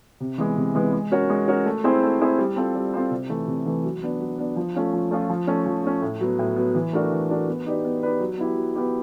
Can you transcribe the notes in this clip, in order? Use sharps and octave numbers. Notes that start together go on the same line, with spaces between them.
C3
E3 G#3 B3
C3
E3 G#3 B3
G#3
C#4 F#4 A#4 C#5
G#3
C#4 F#4 A#4 C#5
A3
C4 E4 G#4 C5
A3
C4 E4 G#4 C5
G3
C4 F4 A4 C5
G3
C4 F4 A4 C5
C3
E3 A3
C3
E3 A3
F#3
B3 D4
F#3
B3 D4
F3
A3 C#4 F4
F3
A3 C#4 F4
F3
A3 C#4
F3
A3 C#4
A2
F#3 B3
A2
F#3 B3
E3
A3 D4 F#4 A#4
E3
A3 D4 F#4 A#4
B3
D#4 G4 B4 D5
B3
D#4 G4 B4 D5
F#3
B3 E4 G4
F#3
B3 E4 G4